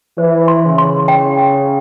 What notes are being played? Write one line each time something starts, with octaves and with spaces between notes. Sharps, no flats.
E3 C5
C6
C#3
C6
G5
G5